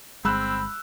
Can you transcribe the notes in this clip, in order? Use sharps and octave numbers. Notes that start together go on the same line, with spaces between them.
G1 G#3 C4 B5 E6 F#6